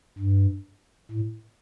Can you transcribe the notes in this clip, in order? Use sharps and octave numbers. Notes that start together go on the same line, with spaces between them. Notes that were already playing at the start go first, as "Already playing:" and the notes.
G2
A2